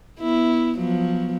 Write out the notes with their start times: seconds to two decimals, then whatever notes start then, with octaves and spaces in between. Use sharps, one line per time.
0.20 B3 E4
0.78 F3 F#3 B3